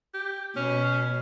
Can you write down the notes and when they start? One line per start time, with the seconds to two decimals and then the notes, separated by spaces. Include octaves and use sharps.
0.14 G4
0.56 B2 C#4